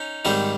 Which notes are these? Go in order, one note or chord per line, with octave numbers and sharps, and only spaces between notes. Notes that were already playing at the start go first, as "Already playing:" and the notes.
Already playing: C#4 D#4
G#2 D#3 G3 C4